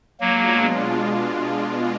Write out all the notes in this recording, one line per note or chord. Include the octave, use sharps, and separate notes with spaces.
B2 F#3 G#3 A#3 D4 F4